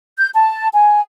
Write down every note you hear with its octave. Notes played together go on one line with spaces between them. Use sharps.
G6
A5
G#5